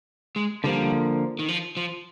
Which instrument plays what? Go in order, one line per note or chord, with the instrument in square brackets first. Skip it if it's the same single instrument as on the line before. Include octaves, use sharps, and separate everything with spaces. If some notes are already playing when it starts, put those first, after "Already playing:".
[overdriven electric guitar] G#3
[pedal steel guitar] D3 F3 A#3 [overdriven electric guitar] G3
[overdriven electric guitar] D#3
F3
F3